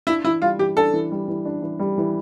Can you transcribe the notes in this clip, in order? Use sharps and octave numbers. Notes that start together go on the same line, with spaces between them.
D4 E4
E3 E4
G3 F4
E3 G4
D4 A4
E3
G3
E3
D4
E3
G3
E3